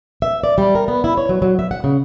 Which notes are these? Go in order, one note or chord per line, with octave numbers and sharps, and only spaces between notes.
E5
D5
G3
A#4
B3
E4
C#5
F#3
F#3
E5
F#5
C#3